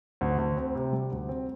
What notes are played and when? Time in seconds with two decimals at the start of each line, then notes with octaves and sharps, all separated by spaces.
0.21 D2
0.38 D2
0.57 C4
0.75 C3
0.93 G3
1.12 D2
1.29 C4